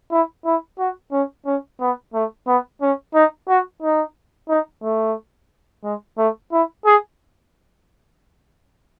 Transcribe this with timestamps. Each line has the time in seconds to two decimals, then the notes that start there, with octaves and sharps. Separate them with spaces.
0.11 E4
0.45 E4
0.79 F#4
1.12 C#4
1.46 C#4
1.81 B3
2.14 A3
2.47 B3
2.82 C#4
3.15 D#4
3.48 F#4
3.82 D#4
4.49 D#4
4.83 A3
5.84 G#3
6.18 A3
6.52 E4
6.85 G#4